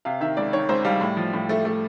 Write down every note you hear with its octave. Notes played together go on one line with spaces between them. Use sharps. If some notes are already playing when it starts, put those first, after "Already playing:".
C3 F5
D#3 E5
C#2 D5
D#3 C#5
C#2 C5
G3 F5
A2
F3
A2
A3
A3